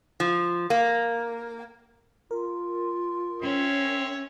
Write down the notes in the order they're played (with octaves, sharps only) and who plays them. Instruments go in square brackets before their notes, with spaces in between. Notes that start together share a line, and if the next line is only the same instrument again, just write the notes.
[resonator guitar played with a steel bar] F3
A#3
[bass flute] F4 [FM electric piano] A#4
[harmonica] C4 C#5 E5 [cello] C#4